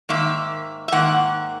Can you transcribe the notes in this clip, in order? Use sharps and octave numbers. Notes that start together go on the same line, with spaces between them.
G#2 D#3 A#3 E5
E5
G#2 D#3 A#3 F#5